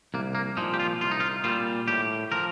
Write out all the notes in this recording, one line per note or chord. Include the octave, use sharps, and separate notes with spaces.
C2 A#3
A#3
A#2 F3 D#4
G4
F4
C2 F4
D#4
F4
A#2 G3 F4
A2 G4
F3 A#4